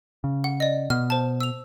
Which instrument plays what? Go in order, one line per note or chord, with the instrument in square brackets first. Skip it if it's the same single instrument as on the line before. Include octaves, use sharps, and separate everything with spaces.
[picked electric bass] C#3
[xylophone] F#5
D5 D#5
[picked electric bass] B2 [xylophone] F6
[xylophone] C5 A5
E6 F7